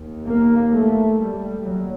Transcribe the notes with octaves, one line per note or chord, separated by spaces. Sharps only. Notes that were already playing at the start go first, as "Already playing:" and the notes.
Already playing: D#2
A#3
A3
G3
D#2 F#3